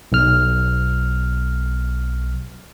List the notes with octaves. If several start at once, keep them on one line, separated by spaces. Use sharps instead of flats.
B1 F6